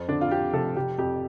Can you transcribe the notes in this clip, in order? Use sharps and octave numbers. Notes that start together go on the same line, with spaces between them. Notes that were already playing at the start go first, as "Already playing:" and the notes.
Already playing: F2 C4
D3 D4
F4
F2 G4
F1 A4
F1 G4
F2 G4